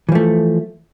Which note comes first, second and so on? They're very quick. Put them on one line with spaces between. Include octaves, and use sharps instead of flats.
E3 F3 A3